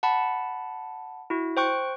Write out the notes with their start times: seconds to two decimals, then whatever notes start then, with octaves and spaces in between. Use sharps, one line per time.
0.03 F#5 A5 B5
1.30 E4 F#4
1.57 C5 G5 C#6 F#6